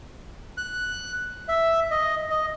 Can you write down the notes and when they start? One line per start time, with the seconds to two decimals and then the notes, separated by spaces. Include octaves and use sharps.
0.57 F#6
1.48 E5
1.91 D#5
2.30 D#5